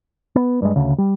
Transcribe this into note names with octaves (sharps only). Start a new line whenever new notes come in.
B3
G2 G#3
D2 C#3
G3